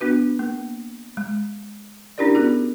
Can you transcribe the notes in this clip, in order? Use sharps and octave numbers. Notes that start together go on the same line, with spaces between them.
B3 D4 F#4 B4
A#3
G#3
C#4 D4 E4 G4 A#4 D5
B3 F#4 G#4